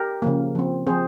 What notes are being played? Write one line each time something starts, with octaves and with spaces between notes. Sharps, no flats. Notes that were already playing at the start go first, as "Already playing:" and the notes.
Already playing: G4 A#4
C#3 F3 A#3
F3 C4
F3 C4 G#4 C5